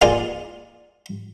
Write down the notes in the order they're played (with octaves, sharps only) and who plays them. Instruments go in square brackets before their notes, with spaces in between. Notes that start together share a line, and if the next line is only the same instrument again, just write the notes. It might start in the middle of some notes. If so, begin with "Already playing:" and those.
[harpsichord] A#3 D#4 F4 G#4 D5